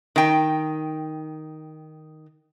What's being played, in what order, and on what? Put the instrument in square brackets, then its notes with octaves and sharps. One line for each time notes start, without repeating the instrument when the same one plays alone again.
[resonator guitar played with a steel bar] D#3 G5